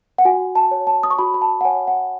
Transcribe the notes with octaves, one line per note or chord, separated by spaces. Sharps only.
F#5
F#4 G#5
A5
C#5
A5
D#6
C#6
F#4 B5
B5
A5
F#5
C#5 G#5
F#5